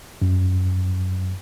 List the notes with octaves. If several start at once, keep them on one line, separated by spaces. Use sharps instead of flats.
F#2